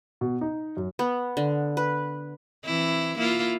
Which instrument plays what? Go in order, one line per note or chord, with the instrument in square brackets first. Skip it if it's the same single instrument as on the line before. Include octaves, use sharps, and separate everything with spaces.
[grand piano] B2
D#4
F#2
[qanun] B3
D3
B4
[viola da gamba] E3 C4 E4
A#3 E4 F4